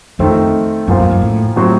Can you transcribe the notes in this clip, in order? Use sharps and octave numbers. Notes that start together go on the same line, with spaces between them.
F2 D#3 A3 C4 D#4
F#2 A#2 F3 A#3 F4 C5
F#2
F#2
A2
A2 F#3 C4 F#4 C5